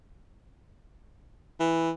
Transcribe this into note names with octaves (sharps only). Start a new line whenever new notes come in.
E3